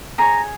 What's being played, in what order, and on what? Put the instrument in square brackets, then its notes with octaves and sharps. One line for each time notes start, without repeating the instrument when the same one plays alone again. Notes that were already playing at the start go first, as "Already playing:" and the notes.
[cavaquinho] G#4 C#5 A#5